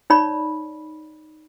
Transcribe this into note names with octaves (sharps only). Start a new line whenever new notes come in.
D#4 C#5 D5 B5